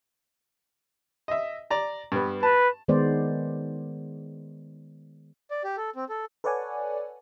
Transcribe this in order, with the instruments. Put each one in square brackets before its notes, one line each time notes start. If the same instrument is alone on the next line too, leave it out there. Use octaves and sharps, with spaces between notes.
[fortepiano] D#5 E5
D5 A#5
G2 B3
[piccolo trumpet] B4 [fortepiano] A5
[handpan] D#3 G#3 B3 C5 D5
[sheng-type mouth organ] D5
G4
A4
C4
A4
[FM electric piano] A4 B4 C#5 D5 F#5 G#5